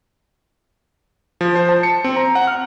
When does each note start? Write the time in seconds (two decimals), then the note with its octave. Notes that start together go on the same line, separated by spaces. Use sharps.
1.41 F3
1.56 C5
1.69 A5
1.83 C#7
2.04 C4
2.16 A#5
2.35 F#5
2.47 F6